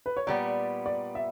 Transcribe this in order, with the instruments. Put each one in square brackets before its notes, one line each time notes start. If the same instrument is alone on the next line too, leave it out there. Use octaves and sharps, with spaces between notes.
[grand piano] B4
C#5
[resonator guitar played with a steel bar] A#2 G3 B3 [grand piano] D5
[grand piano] D5
E5